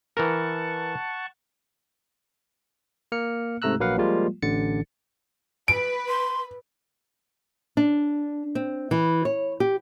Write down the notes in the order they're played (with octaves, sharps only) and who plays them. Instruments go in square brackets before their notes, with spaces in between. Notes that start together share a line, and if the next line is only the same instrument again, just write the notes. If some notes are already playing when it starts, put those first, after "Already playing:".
[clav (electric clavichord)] E3 A#4 [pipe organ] F#5 A5 C#6
[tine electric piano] A#3 F6 C#7
G#2 C3 A3 A#5 E6 F#6
A#1 F#3 A#3 B4 F5 F#5
F3 G3 G#3 A#3 F4
A1 D3 A6 C#7
[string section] B4 [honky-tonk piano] D7
[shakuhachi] C6
[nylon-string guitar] D4
C4
E3
C#5
G4